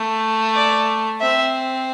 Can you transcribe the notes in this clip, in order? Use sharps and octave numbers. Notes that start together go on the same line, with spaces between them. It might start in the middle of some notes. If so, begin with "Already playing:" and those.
Already playing: A3
D5
C4 E5